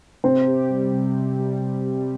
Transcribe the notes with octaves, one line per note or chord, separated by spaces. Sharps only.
C3 C4
G4
G3
C3
C3
G3
C3
G3